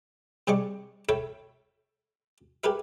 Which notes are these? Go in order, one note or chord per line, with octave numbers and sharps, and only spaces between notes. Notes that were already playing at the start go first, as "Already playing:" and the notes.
C3 G3 G#4 D#5 C#6 D6
A4 C#5 E5 G5 B5
G4 G#4 A#4 B4 E5